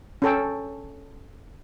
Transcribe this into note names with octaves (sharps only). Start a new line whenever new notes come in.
C#4 A4 G5